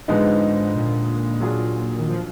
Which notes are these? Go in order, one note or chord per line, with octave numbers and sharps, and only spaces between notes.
G#2 D3 F3 G#3 B3 D#4
A#2
F#3 D4 F4 G#4
D#3
F3